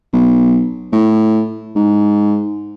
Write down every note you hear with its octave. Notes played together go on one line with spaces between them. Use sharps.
B1
A2
G#2